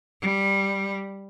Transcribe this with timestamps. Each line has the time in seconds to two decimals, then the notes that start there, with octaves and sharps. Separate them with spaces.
0.21 G3